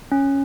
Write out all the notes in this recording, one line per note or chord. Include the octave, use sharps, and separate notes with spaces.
C#4